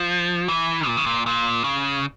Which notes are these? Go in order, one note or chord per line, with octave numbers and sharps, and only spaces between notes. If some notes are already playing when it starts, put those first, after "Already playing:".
Already playing: F3
E3
A#2
C#3
A#2
A#2
C#3